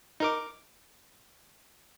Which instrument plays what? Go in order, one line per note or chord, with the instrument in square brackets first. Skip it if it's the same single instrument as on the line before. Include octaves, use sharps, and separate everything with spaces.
[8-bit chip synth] D#4 A#4 D6